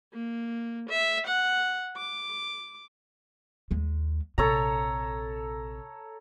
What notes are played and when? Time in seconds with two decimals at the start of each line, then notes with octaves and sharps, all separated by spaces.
0.14 A#3
0.89 E5
1.27 F#5
1.97 D6
3.71 D#2 G#3
4.38 A#1 C3 A4 C#5 A#5